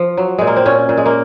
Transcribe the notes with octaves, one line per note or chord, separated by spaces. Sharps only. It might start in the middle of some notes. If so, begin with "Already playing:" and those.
Already playing: F3
F#3
A#2 G#3
A#3
C4
A#2 C#4
A#2
G#3
A#3